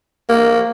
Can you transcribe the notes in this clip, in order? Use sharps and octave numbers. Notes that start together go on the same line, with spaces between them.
A#3